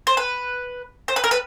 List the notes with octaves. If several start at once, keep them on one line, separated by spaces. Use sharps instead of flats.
C5
B4
C5
B4
A#4
B4